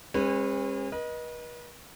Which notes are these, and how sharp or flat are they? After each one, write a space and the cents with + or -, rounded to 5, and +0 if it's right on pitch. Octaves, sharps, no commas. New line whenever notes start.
G#3 -45 C#4 -40 B4 +0
B4 -40 D#5 +0